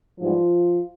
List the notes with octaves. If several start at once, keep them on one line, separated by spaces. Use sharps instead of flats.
G#2 E3 F3 G3 F4